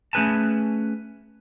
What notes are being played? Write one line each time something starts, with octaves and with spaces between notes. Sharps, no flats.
A3 C#4 G#4 B4 G#5 A5